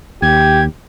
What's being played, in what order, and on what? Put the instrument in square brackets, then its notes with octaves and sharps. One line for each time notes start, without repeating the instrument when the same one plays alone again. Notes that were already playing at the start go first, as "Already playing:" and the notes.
[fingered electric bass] D#2 [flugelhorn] G4 [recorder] G#6